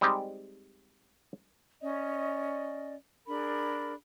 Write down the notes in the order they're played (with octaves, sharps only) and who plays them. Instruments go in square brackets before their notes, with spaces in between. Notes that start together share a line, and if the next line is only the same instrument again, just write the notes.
[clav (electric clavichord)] G3 G#3 C4 D#4 G4
[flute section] C#4 D5 D#5
D4 G#4 A#4 B5